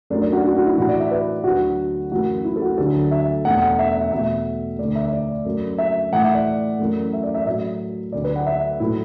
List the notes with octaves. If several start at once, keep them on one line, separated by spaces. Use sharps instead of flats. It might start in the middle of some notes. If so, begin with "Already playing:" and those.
F#2 F#3 A3 D4
D4
F#4
F#4
F#4
E4
A2 E3 A3 F#4
D5
E5
B4
D2 D3 F#3 F#4
F#2 E3 A3 F#4
E4
A4
F#4
D2 D3 F#3 A4
E5
E2 B2 A3 F#5
F#5
E5
E5
E2 B2 A3 E5
D2 D3 A3 D5
E5
D5
F#2 F#3 A3
E5
A2 E3 A3 F#5
E5
D5
F#2 E3 A3
E5
D5
E5
A2 F#3 A3 E5
D2 D3 F#3 D5
B4
F#5
E5
A2 F#3 A3 E4